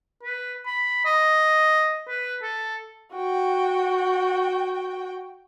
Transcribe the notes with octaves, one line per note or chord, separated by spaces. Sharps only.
B4
B5
D#5
B4
A4
F#4 G5